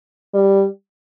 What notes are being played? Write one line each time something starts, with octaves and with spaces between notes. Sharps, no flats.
G3